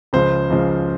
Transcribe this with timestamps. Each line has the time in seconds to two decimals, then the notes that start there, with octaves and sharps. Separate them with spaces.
0.13 C#2 C#3 F3 C5
0.50 C#2 C#3 F3